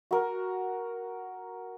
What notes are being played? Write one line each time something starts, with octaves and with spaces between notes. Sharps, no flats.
F#4 A#4